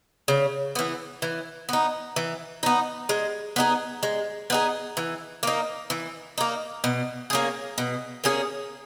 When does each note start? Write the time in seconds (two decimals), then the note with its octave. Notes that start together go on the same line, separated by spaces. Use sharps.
0.28 C#3
0.75 E3 B3
1.22 E3
1.69 B3 D#4
2.16 E3
2.63 B3 D#4
3.09 G#3
3.56 B3 D#4 G#4
4.03 G#3
4.50 B3 D#4 G#4
4.97 E3
5.43 A#3 D#4
5.90 E3
6.38 A#3 D#4
6.84 B2
7.30 A#3 C#4 G#4
7.78 B2
8.24 A#3 C#4 G#4